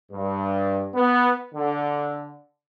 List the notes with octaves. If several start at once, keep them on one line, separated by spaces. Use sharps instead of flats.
G2
B3
D3